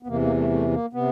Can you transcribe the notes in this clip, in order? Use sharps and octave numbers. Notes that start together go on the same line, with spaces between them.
B3
E2 C3 E3 A#3
A#3
A3
A3
A#3
C3 B3